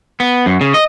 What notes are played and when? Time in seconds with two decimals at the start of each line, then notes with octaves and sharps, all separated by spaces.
0.20 B3
0.46 F#2
0.61 C#3
0.74 D#5